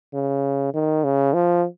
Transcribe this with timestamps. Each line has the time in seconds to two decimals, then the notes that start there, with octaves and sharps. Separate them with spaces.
0.14 C#3
0.74 D#3
1.04 C#3
1.33 F3